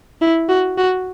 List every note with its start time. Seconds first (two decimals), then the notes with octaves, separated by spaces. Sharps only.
0.21 E4
0.49 F#4
0.78 F#4